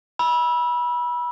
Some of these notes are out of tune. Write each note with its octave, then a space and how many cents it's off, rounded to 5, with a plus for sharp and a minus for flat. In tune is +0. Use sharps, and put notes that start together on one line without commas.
B5 -25 E6 +0